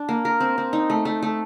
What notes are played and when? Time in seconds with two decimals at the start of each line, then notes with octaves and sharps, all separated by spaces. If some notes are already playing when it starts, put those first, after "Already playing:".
Already playing: D4
0.09 A#3
0.25 A#4
0.40 C4
0.58 C4
0.73 D#4
0.90 A3
1.05 A3
1.22 A3